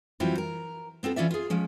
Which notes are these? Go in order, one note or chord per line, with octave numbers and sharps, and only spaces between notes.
E3 F#3 G3 C4 E4 F4
A#4
B3 C4 F4 A4
E3 C#4 F4 D5 E5
F4 G#4
F3 G#3 C#4